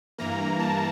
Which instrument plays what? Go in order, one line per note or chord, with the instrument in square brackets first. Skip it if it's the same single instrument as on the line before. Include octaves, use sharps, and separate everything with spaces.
[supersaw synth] G2 E3 A#3 A#5
A5